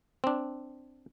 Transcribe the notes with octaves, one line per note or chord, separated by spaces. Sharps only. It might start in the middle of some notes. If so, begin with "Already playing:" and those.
C4 D4